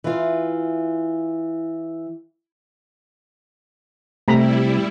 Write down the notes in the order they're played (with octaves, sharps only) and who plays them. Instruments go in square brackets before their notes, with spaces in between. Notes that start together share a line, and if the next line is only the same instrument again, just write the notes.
[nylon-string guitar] E3 F4
[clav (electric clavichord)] C3 [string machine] G3 E4 [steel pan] A3 A#5 B5